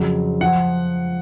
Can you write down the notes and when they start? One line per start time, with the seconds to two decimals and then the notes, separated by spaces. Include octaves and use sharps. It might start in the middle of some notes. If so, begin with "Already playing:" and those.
Already playing: F2 C#3 F#3
0.41 F3 F#5